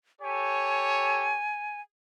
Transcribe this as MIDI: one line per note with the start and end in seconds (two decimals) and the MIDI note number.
0.21 1.37 67
0.21 1.37 69
0.21 1.37 73
0.21 1.81 80